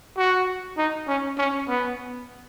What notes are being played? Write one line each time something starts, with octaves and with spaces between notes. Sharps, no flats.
F#4
D#4
C#4
C#4
B3